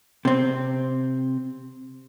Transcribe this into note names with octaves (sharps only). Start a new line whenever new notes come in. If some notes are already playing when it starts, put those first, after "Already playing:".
C3 C4